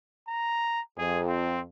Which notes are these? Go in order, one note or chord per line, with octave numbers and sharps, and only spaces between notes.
A#5
F2 G#4
C4